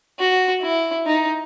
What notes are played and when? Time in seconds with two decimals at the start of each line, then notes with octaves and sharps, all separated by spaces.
0.19 F#4
0.62 E4
1.07 D#4